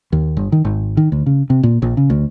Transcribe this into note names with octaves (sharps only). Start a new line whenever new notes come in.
D#2
G1
D#3
G#1
D#3
D2
C#3
C3
A#2
A#1
C#3
D2